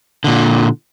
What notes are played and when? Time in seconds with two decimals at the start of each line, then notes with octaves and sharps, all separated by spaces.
0.24 A#2 D3